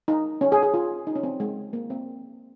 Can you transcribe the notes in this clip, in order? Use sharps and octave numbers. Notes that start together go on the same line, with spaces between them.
D#4
C#4
G#4
G#4
F4
D#4
C#4
C4
G#3
A#3
C4